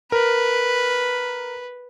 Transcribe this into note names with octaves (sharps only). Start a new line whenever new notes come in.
A#4 B4